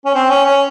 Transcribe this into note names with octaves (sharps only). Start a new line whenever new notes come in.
C#4
C4
C#4
C#4